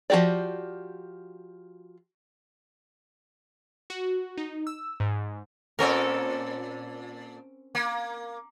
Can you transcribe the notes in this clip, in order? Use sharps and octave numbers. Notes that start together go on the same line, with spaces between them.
F3 A3 F#4 G4 D5
F#4
D#4
E6
G#2
A#2 C4 C#4 A4 A#4 D5
A#3